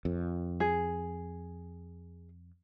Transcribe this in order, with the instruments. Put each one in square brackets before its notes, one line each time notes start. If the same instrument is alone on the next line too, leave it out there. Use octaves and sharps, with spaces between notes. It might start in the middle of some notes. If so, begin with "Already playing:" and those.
[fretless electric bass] F2
[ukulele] G#4